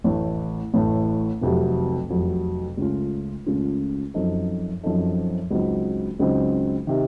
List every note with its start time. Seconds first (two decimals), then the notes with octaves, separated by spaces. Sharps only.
0.04 A1 A2 A3
0.74 A1 A2 A3
1.41 F1 F2 C3 F#3
2.09 F1 F2 C3 F#3
2.77 C#2 C#3 A3 C#4 F4
3.46 C#2 C#3 A3 C#4 F4
4.14 F#2 F3 C4 D#4 A4
4.83 F#2 F3 C4 D#4 A4
5.51 C#2 C#3 F#3 C4 D#4
6.19 C#2 C#3 F#3 C4 D#4
6.87 C3 D#3